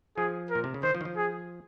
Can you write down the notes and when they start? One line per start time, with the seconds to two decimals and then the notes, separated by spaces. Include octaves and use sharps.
0.17 F3 G#4
0.50 A#4
0.55 A#2
0.64 C3
0.74 C#3
0.83 D#3 C5
0.95 F3
1.01 D#3
1.05 F3
1.17 G#4